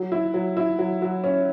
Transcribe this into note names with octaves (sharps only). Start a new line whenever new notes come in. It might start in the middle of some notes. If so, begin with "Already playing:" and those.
Already playing: F#3
E4
F#3
E4
F#3
F#3
C#4